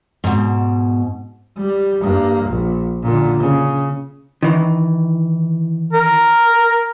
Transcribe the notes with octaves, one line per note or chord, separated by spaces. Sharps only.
G#2 B2
G3
G2 A#3
A#1
A#2 D3
C#3
D#3 E3
A#4